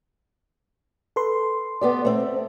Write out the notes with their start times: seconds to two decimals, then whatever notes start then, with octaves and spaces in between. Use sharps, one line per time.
1.16 A4 B4 C6
1.81 B3 G4 D5
2.05 A3 C4